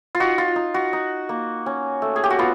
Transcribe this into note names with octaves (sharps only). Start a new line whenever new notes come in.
F4
D#4 F#4
F4
D#4
F#4
D#4
A#3
C#4
A3
G#4
G4
F#4
B3 F4